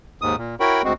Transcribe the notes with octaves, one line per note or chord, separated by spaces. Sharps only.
D#2 G#2 D#6
A#2
E4 F#4 A#4 C#5 G5 B5
D2 G#3 C4 F#4